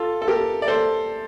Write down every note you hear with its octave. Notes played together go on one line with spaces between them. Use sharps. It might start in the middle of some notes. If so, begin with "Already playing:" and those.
Already playing: F4 A4
A4
G4 A#4
D5
A4 C5